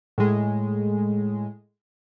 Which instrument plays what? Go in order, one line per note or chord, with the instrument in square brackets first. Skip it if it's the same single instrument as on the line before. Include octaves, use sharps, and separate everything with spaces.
[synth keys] A2 G#3